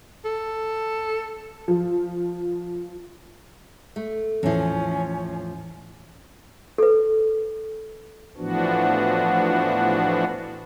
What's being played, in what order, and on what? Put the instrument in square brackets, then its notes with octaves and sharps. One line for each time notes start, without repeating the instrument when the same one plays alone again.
[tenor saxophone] A4
[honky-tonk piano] F3
[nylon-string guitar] A3
[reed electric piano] E2 E3 [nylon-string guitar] A2 F3 [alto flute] C#4
[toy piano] A4 B4
[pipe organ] A2 E3 F3 B3 D4 F#4